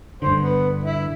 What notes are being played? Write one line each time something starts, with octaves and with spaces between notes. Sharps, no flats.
G2 D3 C5
B3
E4